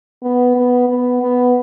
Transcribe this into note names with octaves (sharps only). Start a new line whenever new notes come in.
B3
B3
B3
B3